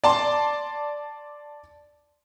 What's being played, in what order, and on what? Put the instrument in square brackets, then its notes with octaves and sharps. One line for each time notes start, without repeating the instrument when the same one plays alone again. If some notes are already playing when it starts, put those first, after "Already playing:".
[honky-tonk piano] D5 A5 C6